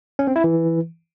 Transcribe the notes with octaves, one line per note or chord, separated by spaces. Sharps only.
C#4
C4
E4
E3